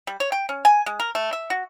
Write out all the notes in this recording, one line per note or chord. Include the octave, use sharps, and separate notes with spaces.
G3
C#5
G5
C#4
G#5
G#3
A#4
A3
E5
F#4